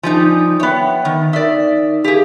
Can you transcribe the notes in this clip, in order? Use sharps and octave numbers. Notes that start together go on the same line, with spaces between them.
F3 G3 D#4 G#5
B3 C#5 E5 G5
D#3
D#4 A#4 D5 E5
G4 G#4 E5 F5